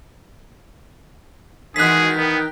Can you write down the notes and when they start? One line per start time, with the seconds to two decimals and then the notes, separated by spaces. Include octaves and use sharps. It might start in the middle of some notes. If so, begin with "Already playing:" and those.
1.76 D#3 E3 G#3 F#4 G#4 F#6 B6
2.17 B3 A#4 G5